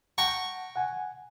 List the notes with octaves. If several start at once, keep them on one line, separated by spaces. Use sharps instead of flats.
F#5 G5 A5 A#5 C#6
F#5 G#5